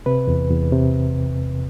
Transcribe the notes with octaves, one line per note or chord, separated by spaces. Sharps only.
C3 B4
E2
E2
C3